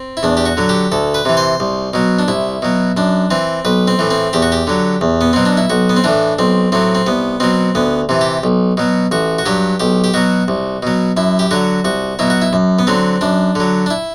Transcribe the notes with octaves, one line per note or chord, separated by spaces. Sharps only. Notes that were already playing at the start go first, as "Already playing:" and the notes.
Already playing: C4
E4
E2 D4
G4
F#4
D3 F#3
G4
D2 A4
B4
C3 E3
C5
C2
B2 F#3
D4
C2 E4
B2 F#3
F#2 D4
E3 C4
B1 B4
C4
A2 E3
C4
E2 G4
F#4
G4
D3 F#3
E2
B3
B2 F#3 C4
D4
E4
B1 F#4
B3
C4
A2 E3 D4
B1 C4
A2 F#3 C4
C4
C2 B3
B2 F#3 C4
D2 B3
C3 E3
G4
B1
B2 F#3
A1 F#4
F#4
G2 F#3 G4
B1 G4
G4
B2 F#3 F#4
C2
B2 F#3
F#2 E4
G4
D3 F#3 F#4
C2 F#4
B2 F#3 E4
F#4
E4
F#2
B3
D3 F#3 C4
F#2 D4
D3 F#3
D4
E4